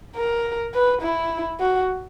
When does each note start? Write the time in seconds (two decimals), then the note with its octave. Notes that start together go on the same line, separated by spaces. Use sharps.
0.16 A#4
0.74 B4
1.02 E4
1.60 F#4